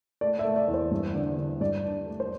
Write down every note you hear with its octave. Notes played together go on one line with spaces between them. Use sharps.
A3 D5
E5
A3
D5
E2
C5
G2
D3
D3
G2 D5
D4
A3
C5